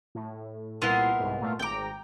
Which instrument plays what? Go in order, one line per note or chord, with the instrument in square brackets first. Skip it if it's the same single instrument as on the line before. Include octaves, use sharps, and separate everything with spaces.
[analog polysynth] A2
[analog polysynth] C2 A#2 C6 [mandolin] B3 E4 A#4
[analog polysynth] C2 G#2
A#2 A3 F4
[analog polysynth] G#1 A#5 [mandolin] G5 D6